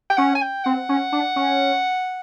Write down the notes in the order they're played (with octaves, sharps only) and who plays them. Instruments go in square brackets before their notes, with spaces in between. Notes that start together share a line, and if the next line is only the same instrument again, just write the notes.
[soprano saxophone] G5
[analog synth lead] C#4 [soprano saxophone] F#5
[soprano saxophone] G#5
G5
[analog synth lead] C4 [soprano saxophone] F#5
[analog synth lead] C#4
D4
C#4